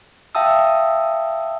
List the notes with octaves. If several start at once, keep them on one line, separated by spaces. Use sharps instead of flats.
E5 F5 G5 A5 D#6 E6